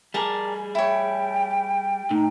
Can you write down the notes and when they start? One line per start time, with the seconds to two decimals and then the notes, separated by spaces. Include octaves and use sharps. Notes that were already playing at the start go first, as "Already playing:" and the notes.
0.14 G3 G#4 A#4 D5 A5
0.75 E4 C#5 G5
2.11 A2 D#4